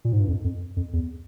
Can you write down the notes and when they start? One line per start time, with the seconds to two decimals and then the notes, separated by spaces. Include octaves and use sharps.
0.05 A#2
0.12 G#2
0.20 G2
0.28 F2
0.44 F2
0.77 F2
0.93 E2